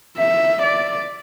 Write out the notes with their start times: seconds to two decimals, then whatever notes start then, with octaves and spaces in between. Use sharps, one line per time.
0.18 E5
0.63 D5